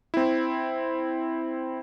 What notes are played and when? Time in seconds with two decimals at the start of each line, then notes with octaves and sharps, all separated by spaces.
0.14 C4 E4